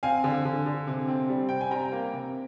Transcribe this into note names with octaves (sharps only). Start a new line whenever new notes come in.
C4 F5 G#5
D3
D3
D3
C3
C4
G3
C3 G5
G#5
G3 G5 A#5
A#3
C3